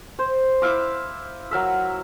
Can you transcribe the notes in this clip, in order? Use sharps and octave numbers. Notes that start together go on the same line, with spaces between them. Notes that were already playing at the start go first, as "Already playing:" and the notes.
C5
E4 E5 F5 D6
F#3 A#4 E5